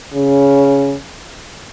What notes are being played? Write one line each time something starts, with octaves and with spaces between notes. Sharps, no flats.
C#3